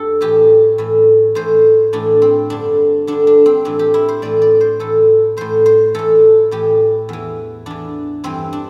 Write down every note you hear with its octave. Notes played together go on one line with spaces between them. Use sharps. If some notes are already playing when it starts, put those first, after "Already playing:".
Already playing: G2 A4
A2 E3 G4
A2 E3
A2 E3 C5
A2 E3 D4
C4
G2 D3 D4
G2 D3 D4
D4
C4
A2 E3 D4
G4
E4
C5
A2 E3 D5
D5
C5
A2 E3 A4
A2 E3 C5
C5
A2 E3 A4
A2 E3 G4
E2 E3
E2 E3 D4
G2 E3 C4
D4